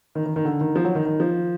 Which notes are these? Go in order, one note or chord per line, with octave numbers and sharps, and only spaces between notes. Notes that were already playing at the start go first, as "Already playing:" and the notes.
D#3
D#3
D#3
D3
D#3
F3
F#3
D#3
D#3
F3